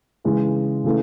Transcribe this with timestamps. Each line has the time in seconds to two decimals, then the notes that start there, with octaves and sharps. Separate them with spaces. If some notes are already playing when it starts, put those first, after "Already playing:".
0.25 C#3 E3 G#3
0.84 C#3 E3 A3